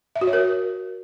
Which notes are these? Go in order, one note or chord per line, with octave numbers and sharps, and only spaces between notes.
E5
F#4
C#5
A#4